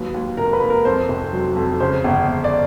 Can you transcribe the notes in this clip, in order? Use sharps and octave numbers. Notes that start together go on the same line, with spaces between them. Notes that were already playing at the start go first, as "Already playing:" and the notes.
Already playing: D#2 F#3 B4
D#2
F1 A#4
B4
D#2
A#4
F2 C5
F1
F#3
F2
C#3 C5
G1
G1
D5